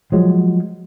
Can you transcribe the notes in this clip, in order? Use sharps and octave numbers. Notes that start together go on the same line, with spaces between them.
F3 F#3 G#3